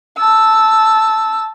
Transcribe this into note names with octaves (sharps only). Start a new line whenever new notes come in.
A5 E6